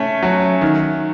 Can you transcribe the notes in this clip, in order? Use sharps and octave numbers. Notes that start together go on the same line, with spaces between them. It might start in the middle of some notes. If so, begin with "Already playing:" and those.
Already playing: A3 C#4
F#3
D#3